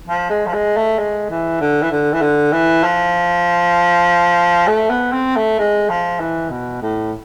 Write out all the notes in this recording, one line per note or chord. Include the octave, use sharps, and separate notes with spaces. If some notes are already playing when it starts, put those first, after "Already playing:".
F3
G#3
F3
G#3
A3
G#3
E3
D3
E3
D3
E3
D3
E3
F3
A3
B3
C4
A3
G#3
F3
E3
B2
A2